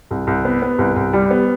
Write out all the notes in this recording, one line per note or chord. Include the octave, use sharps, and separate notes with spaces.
C2
C2
B3
B3
C2
C2
G3
B3